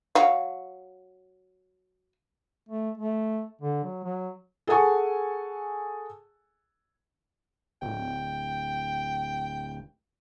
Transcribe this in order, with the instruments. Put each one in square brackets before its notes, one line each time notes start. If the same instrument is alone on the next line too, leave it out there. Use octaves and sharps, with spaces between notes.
[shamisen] F#3 F5
[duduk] A3
A3
D3
F#3
F#3
[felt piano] G#4 A4 F#5 G#5 A5 C#6
[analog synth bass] D1 [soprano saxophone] G5